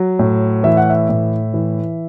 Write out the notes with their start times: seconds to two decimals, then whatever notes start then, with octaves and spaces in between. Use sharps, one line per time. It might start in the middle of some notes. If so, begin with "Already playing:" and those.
Already playing: F#3
0.19 A2
0.63 E3 E5
0.77 F#5
0.90 E5
1.09 A2
1.54 E3